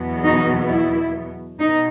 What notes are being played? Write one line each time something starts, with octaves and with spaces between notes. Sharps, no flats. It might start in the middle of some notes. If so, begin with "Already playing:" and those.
Already playing: E2 B2 F#3 B3
D#4 F#4
E4
B2 D#4